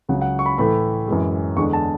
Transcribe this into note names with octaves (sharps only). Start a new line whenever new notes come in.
C#2 C#3 F#3 F#5
F#5
C#6
B5
A2 E3 A3 B5
F#2 E3 G#3
E2 D3 G#3 C#6
A5